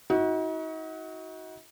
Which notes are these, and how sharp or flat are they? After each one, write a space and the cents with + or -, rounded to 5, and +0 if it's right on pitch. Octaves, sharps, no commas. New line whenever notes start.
D#4 +40 F#4 +0